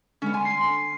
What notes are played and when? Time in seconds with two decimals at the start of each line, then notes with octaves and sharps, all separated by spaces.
0.22 D3 G#3 B3 C#4
0.34 G#5 C6
0.45 C7